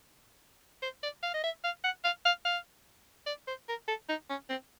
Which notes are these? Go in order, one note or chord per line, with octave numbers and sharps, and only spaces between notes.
C5
D5
F5
D#5
E5
F5
F#5
F5
F5
F5
D5
C5
A#4
A4
D#4
C#4
C4